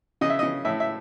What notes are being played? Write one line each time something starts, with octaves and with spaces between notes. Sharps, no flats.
C#3 D#5
E5
C#3 D#5
A2 E5
E5